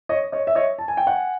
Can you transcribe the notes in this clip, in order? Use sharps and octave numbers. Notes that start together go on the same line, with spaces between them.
C#5 D#5
C#5 D#5
E5
C#5 D#5
A5
G#5
G5
F#5 G#5